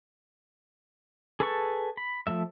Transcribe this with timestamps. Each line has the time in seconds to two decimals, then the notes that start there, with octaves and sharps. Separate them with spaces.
1.40 G#4 A4 B4 A5 C#6
1.97 B5
2.27 F3 G3 A3 E5